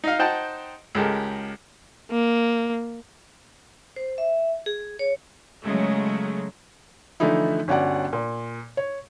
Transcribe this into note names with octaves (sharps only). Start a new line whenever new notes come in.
D#4 D#5 F5
D#4 C5 F#5 G5 A5
C#2 G#3 G4 A4 A#4
A#3
C5
E5
G#4
C#5
C#3 F#3 G#3 A3
D3 E3 F3 A3 D#4 E4
G1 C#4 F#4 D5 F#5
A#2
C#5